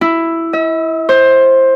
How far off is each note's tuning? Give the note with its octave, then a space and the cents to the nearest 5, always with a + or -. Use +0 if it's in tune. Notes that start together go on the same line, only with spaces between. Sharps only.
E4 +5
E5 -45
C5 +15